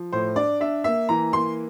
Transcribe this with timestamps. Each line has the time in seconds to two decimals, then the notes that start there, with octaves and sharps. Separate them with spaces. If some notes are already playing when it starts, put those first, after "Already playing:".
Already playing: F3
0.13 A2 C5
0.36 D4 D5
0.61 D4 E5
0.84 A#3 E5
1.09 E3 A#5
1.33 A#3 C6